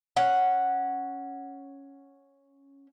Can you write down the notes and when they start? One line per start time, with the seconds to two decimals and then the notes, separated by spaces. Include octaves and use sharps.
0.16 C#4 F#5